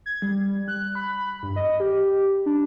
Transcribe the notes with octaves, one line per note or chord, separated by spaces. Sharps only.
G#6
G3
F#6
B5
G2
D#5
G4
D4